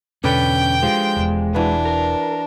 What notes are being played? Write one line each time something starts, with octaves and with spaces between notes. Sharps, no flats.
E2 B2 D3 C#4 D4 A4 B4 G5
F3 G#3 G4
E1 E2 D4
E3 D4 F#4 B4
A#4